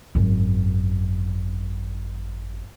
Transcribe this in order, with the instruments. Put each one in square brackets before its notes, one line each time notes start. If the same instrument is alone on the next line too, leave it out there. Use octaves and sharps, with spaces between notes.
[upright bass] G#1 F#2